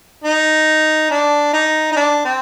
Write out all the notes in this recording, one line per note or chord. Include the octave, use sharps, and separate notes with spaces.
D#4
D4
D#4
D#4
D4
C4